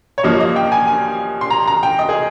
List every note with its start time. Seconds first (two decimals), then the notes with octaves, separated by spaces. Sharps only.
0.18 C#5
0.23 G2 F3 A#3 D#5
0.40 D#5
0.56 G5
0.72 G#5
0.87 G#5
1.41 C6
1.50 A#5
1.68 A#5
1.83 G5
1.99 D#5
2.09 G#4